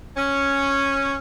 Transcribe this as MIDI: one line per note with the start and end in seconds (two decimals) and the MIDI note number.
0.17 1.18 61